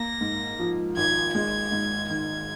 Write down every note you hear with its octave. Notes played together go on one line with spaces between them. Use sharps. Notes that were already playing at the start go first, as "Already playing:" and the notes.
Already playing: A#3 A#6
G#2
F3
G#1 G#6
G#3 G#6
G#2
D#3 G#6